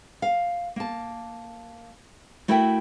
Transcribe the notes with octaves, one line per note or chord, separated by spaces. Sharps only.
F5
A#3 A5
A3 E4 F#4 A#4 E5 G5